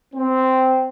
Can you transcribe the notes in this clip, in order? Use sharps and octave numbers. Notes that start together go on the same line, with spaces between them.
C4